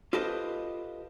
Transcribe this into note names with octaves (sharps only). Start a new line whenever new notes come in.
F4 G4 A4 B4 C5 D#5